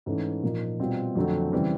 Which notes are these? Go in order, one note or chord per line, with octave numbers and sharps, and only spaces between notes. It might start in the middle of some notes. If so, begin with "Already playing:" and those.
G#2 E3 A3 C#4
A#2 F3 A#3 D#4
B2 G3 C4 F4
F2 D3 F#3 A3 C4
C#3 E3 G3 C4